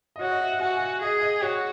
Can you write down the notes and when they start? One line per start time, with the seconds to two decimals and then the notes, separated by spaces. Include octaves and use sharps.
0.16 D#5
0.21 F#4 C#5
0.31 D#5
0.41 E5
0.52 F#5
0.61 F#4 G#5
0.77 G#5
0.81 F#5
1.02 G#4 D#5
1.21 D#5
1.42 F#4 C#5